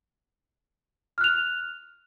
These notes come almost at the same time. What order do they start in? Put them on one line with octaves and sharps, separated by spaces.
F6 F#6 F7